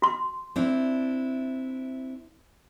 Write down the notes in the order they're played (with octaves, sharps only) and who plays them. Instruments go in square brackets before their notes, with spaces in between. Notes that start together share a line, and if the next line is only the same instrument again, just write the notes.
[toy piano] F#4 C6
[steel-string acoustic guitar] C4 D4 E4